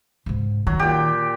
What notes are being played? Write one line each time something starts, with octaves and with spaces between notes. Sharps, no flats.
G#2 C#3
D#3 F#3
A#2 G4